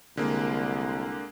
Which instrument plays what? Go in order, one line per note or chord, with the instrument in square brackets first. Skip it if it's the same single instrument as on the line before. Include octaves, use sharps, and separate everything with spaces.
[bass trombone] C2 [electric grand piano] D3 G#3 A#3